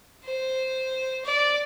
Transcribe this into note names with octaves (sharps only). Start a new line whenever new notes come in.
C5
D5